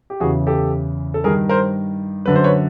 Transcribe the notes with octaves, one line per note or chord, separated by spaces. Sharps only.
G4
E2 C#3 E3 F#4 G#4
G4 A4
A4
G2 D#3 G#4 A#4
A#4 C5
F#2 D3 B4
C5
B4 C#5